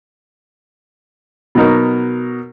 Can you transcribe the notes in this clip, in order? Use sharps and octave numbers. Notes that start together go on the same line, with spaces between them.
B2 F#3 D#4 A#4